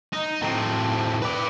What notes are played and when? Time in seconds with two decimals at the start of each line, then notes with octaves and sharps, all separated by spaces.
0.13 D#4
0.42 A2 C4
1.22 B4 D5